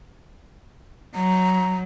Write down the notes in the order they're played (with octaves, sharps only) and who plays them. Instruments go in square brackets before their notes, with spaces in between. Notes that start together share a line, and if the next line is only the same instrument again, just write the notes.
[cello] F#3 [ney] A#5